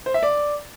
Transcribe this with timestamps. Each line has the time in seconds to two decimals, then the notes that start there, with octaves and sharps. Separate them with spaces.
0.06 C5
0.14 E5
0.23 D5